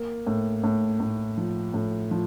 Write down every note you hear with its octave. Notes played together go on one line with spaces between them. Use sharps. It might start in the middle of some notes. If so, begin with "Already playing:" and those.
Already playing: A#3
A2
A2
A2
F3
A2
F3